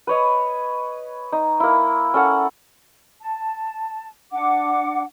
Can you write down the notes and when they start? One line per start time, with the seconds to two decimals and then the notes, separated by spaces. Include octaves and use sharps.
0.07 B4 C#5 D#5
1.32 D#4
1.60 A#3 E4
2.14 C#4 A4 F#5
3.21 A5
4.32 D4 F#5 D6